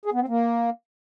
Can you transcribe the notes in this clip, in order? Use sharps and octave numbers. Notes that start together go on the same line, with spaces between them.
G#4
B3
C4
A#3